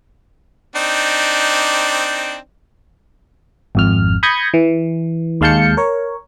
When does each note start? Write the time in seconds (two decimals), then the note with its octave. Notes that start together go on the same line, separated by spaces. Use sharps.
0.76 C4 D4 D#4
3.75 G#1 F2 F6
4.23 B5 D#6 G6 G#6 A#6 C#7
4.54 E3
5.41 D#2 G#3 F5 A5 G6 C#7
5.77 A#4 C#5